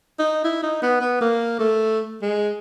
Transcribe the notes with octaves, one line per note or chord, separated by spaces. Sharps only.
D#4
E4
D#4
B3
B3
A#3
A3
G#3